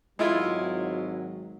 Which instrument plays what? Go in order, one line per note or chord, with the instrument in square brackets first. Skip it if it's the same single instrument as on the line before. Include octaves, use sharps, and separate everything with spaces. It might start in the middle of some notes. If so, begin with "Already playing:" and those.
[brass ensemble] G#1 F#3 [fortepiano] G#3 E4 F4